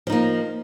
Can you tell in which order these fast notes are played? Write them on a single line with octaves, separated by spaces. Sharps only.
F3 D#4 A#3